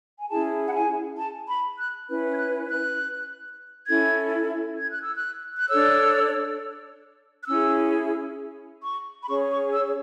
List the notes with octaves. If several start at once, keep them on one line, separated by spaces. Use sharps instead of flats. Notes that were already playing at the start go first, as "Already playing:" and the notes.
G#5
C#4 E4 G#4 A5
F#5
G#5
A5
B5
F#6
C#4 E4 B4
G#6
F#6
F#6
C#4 E4 A4 G#6
G#6
F#6
E6
F#6
F#6
D4 A4 C#5 E6
F#6
C#4 E4 G#4 E6
C#6
B5
C#4 G#4 C#5 C#6
C#6
E6